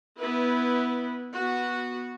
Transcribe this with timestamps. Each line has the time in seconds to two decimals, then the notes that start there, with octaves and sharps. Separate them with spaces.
0.19 B3 E4 B4
1.35 B3 F#4